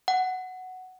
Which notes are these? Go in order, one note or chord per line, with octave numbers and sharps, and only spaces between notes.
F#5